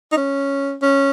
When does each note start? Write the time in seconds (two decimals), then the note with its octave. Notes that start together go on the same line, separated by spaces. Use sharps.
0.12 D#4
0.17 C#4
0.82 C#4